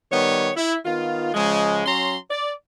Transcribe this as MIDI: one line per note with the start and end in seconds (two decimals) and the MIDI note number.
0.11 0.50 51
0.11 0.50 55
0.11 0.50 59
0.11 0.50 73
0.57 0.75 64
0.86 1.32 51
0.86 1.32 59
0.86 1.32 65
1.34 1.85 49
1.34 1.85 53
1.34 1.85 56
1.86 2.16 54
1.86 2.16 61
1.86 2.16 82
1.86 2.16 84
2.31 2.51 74